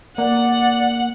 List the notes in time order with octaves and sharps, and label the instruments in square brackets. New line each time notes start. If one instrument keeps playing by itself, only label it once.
[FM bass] A#3 [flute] D5 [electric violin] F#5